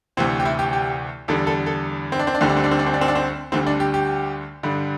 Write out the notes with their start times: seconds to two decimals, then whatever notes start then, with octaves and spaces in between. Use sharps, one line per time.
0.17 D2 C3 E3 C4
0.40 G4
0.45 E4
0.59 G4
0.73 G4
1.28 E2 D3 G3 A4
1.47 A4
1.66 A4
2.12 C4
2.19 D4
2.27 C4
2.35 D4
2.41 D2 D3 G3 C4
2.49 D4
2.57 C4
2.64 D4
2.71 C4
2.79 D4
2.86 C4
2.94 D4
3.01 C4
3.08 D4
3.15 C4
3.52 D2 D3 G3 C4
3.67 D4
3.80 G4
3.94 G4
4.63 G2 D3 G3